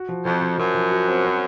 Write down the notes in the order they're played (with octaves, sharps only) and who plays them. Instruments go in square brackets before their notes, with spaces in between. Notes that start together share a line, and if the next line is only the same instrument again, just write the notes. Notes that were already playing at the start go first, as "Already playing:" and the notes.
Already playing: [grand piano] F#4
F3
[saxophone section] F2 [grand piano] F3
[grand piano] F3
[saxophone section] F#2 [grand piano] F3
[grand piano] F3
F#4
C4
C4